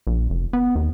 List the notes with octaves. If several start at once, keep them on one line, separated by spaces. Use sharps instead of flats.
A#1
F1
B3
D#2